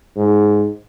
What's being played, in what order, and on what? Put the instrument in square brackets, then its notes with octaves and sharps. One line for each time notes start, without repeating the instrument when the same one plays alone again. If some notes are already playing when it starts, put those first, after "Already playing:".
[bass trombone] G#2